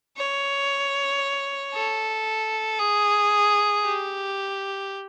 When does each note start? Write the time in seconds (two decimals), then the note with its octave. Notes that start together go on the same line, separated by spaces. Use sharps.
0.18 C#5
1.74 A4
2.79 G#4
3.84 G4